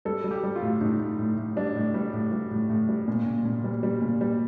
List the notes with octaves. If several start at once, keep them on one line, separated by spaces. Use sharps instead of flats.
G3 A4
G3
G4
G3
F4
A2
A2 D#4
A2
A2
A2
G3 D4
A2
G3
A2
G3
A2
A2
G3
A#2
A#2
A#2
G3
G3
A#2
G3